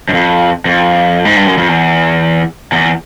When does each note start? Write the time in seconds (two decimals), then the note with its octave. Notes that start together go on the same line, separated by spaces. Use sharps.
0.09 F#2
0.13 F2
0.65 F2
1.25 G#2
1.36 G2
1.47 F#2
1.58 F2
1.69 E2
2.72 E2